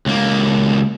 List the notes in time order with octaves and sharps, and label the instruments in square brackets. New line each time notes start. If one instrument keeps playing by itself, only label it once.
[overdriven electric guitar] C#2 A#3